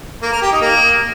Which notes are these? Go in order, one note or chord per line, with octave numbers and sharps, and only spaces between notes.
A#3
A#4
G4
D#4
A#3